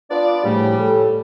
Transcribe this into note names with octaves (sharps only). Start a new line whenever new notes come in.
B3 D4 F4 D5
A2 C#3 F3 G3 G4
A4